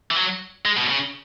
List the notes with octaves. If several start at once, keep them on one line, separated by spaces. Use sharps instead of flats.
E3
F#3
G#3
B2
C#3